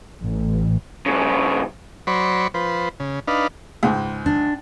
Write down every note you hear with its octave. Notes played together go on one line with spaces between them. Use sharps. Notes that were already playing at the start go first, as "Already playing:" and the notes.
A1
G2 C#3
F#3 C5 D5 B5 C#6
F3 B4 C5
C#3
D4 D#4 B4 F5
C#2 G#2
D4